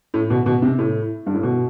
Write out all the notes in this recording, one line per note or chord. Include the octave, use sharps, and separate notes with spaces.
A2
B2
B2
C3
A2
G2
A2
B2